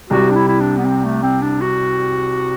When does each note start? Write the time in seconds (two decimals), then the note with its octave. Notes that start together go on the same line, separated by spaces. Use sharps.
0.10 C2 C3 G3 F#4
0.31 D4
0.35 E4
0.48 E4
0.60 D4
0.77 B3
0.86 C4
1.04 A3
1.23 C4
1.42 D4
1.61 F#4